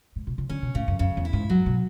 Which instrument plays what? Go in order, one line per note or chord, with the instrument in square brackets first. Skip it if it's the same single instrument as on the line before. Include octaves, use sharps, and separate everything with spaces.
[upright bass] A2
B2
C#3
[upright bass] D3 [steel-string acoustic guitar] C#4
[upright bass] B2
[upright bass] A2 [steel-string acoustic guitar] C#3
[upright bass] F#2
[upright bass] F#2 [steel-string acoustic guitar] C#3
[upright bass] E2
[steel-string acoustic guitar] E4
[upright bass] G#2
[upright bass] G#2 [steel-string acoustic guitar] F#3
[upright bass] B2